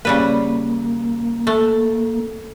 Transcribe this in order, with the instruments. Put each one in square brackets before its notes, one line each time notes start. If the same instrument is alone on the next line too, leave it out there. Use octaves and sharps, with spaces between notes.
[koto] C#3 G3 B4 [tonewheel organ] A#3
[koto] A3